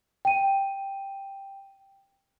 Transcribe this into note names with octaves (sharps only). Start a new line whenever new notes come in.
G5 D#7